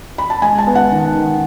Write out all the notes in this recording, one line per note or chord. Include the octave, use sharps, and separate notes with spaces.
B5
A5
G#3 G#5
A5
B3
F#5
D#3
D#3